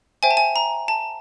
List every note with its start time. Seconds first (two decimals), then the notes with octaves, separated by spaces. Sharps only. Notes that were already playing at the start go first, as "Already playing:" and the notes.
0.23 C5 E5 G5 G#5
0.31 A5
0.37 G#5
0.56 A#5
0.88 A5